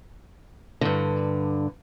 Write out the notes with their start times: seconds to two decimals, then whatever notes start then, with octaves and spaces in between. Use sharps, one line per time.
0.81 G2 D3